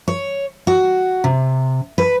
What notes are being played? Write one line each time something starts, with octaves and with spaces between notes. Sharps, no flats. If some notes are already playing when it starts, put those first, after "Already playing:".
C#5
F#4
C3
B4